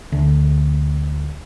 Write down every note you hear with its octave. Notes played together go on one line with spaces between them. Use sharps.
D2